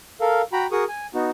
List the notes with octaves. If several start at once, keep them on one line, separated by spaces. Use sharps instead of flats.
A4 A#4 F5
F#4 G5 A#5 B5
F#4 G#4 A#4 C#6 D#6
G#5
B3 D#4 F#4